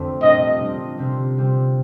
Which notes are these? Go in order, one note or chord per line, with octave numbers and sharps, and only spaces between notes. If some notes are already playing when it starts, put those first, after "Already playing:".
Already playing: F2 D3 A3 C4
A#2 G3 D4 F4 D#5
A#2 G3 D4 F4
C3 G3 C4 F4
C3 G3 C4 F4